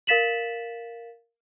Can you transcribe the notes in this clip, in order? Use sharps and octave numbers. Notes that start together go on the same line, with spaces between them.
A#4 F5 A6 B6 E7 F#7